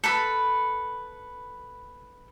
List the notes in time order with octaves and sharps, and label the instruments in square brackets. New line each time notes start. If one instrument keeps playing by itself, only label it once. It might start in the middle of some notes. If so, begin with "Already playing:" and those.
[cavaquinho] A4 B4 B5